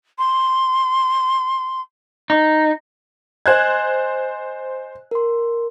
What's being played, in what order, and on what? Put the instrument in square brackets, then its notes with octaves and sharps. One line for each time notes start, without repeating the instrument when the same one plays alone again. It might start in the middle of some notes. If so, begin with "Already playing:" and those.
[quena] C6
[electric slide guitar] D#4
[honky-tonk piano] C5 F#6 G#6 [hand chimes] D#5 G#5
[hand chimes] A#4 C6